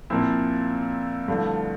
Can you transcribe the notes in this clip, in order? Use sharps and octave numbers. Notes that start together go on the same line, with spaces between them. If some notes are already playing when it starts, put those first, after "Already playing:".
A#2 F3 C4 E4
G2 D3 F3 A3 E4